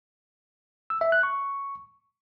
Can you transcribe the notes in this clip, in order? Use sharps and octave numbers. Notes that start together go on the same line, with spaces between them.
E6
E5
F#6
C#6